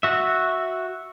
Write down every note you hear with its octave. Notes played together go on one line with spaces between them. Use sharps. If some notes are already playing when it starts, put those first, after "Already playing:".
F#4 E5